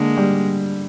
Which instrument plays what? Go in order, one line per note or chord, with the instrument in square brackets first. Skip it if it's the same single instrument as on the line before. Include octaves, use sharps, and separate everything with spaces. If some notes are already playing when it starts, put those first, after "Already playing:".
Already playing: [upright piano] D3 [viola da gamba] G#3 A#3
[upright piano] G3